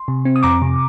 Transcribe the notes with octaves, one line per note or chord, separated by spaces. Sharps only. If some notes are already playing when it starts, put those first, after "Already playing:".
Already playing: C6
C3
C4
D#6
F2 A#5 D6
C3